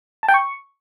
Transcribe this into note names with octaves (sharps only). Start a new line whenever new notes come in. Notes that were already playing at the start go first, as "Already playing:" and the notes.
A5
G5
C#6